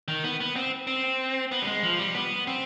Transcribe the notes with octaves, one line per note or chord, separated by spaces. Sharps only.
D#3
B3
B3
C4
C4
B3
G3
G#3
F3
G3
B3
C4